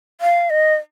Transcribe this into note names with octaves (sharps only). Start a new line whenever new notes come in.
F5
D#5